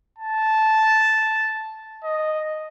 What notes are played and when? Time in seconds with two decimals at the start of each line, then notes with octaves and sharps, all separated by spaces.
0.19 A5
2.04 D#5